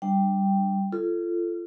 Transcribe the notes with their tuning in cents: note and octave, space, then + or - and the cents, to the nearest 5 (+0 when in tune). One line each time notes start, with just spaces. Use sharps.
G3 -5 D4 +5 G5 +0
F4 -25 A4 +0